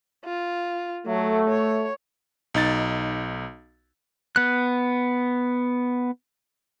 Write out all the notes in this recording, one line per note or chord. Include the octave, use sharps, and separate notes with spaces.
F4
F#3 A3
C#5
B1 D#4 A6
B3 F#6